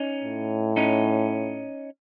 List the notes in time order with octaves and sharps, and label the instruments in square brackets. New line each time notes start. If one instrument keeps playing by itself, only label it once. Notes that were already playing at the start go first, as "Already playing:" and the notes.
Already playing: [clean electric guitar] C#4 D#4
[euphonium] A2
[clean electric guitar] C#4 D#4